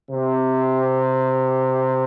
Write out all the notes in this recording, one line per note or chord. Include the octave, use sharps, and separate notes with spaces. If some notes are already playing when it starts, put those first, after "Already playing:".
C3